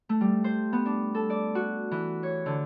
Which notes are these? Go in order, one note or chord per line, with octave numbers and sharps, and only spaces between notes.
A3
G3
C5
B3
D4
A4
D5
F#4
E3
C#5
D3